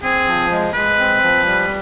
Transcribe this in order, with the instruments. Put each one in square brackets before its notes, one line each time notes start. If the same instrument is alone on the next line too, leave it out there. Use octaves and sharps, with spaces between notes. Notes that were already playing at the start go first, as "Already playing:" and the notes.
[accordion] C4 [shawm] G#4
[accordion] F3
G#3
[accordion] G#3 [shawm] B4
[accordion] C4
F3
G3